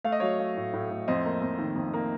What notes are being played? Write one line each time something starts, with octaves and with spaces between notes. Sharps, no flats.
A3 F5
D#5
F#3 C#5 F5
A3
A2
A2
A2
F2 C5 D#5
A#3
F2
D#3
F2
A#3